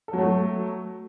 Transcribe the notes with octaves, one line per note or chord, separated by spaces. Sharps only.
F#3 A3 A4